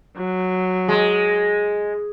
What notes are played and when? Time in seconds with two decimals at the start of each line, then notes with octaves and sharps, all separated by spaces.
0.17 F#3
0.88 G#3